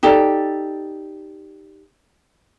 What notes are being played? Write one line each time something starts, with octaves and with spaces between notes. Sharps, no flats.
D#4 G4 A4 D5